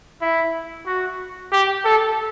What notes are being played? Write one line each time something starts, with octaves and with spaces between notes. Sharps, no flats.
E4
F#4
G4
A4